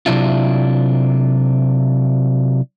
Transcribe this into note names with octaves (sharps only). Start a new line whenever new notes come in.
C3 F#3 D4 E4 F4